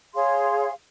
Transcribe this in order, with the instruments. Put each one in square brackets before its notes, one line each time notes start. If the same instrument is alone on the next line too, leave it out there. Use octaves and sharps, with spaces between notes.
[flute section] G#4 C#5 F5 C6